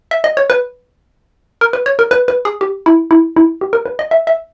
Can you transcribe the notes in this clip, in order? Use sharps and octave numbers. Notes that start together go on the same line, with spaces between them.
E5
D#5
C#5
B4
A#4
B4
C#5
A#4
B4
B4
G#4
G4
E4
E4
E4
G4
A#4
B4
D#5
E5
E5